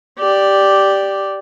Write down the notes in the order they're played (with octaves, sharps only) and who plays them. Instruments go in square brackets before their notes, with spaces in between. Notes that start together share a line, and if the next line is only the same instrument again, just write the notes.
[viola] G4 D5